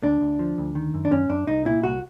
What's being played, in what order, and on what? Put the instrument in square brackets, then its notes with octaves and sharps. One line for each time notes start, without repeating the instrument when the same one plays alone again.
[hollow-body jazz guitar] D2 D4
D2
F3
D2
D#3
F#2
D4
F#2 C#4
F#2 D4
C2 D#4
A#2 E4
C2 F#4